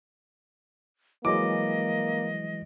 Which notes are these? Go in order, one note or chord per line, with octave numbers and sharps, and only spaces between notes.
E3 F#3 G#3 A#3 D#5 D6